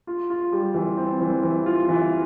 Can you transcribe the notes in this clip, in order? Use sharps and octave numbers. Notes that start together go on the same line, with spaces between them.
F4
F4
G3
E3
C4
E3
E3
F4
E3